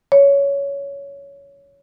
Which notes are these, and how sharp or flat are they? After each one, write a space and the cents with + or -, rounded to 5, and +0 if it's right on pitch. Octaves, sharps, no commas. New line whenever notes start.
C#5 +15